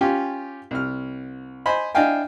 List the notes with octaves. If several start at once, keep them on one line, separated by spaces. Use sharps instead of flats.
C#4 F4 G4
C2 F6
C5 D#5 G#5 B5
D4 E4 D#5 F5 G5 G#5